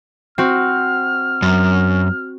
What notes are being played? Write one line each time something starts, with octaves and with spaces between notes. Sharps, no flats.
C4 F#4 F6
F#2